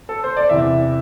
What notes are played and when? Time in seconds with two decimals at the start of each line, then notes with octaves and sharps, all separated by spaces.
0.09 A4
0.24 C5
0.37 D5
0.49 E2 C3 E3 E5